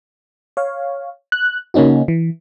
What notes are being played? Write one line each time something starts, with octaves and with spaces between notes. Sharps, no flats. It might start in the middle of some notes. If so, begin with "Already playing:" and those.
C#5 F5
F#6
C#3 A#3 C#4 D#4 F#4
E3